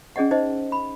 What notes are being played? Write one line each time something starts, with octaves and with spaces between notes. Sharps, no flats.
C#4 G#4 D5 D#5 F#5
D#4 C5 D#5
B5